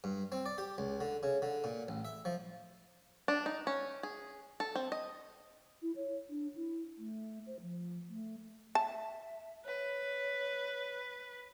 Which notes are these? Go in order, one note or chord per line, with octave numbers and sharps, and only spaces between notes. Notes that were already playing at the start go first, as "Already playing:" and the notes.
G2
C4
D5
G4
C#2
D3
C#3
D3
A#2
A1
E5
F3
D4
D#4
C#4
G#4
A4
C4
D#5
E4
C#5
D4
E4
A3
C5
F3
A3
E5 A5
B4 C#5